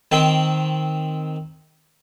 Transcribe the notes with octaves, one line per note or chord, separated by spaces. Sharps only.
D#3 C4 G5